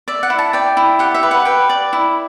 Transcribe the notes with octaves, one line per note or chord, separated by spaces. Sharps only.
D5 E5
F#5
E4
A5
D5 G5
E4
G4 F#5
E5
B4
F#5
B4 G5
D5
E4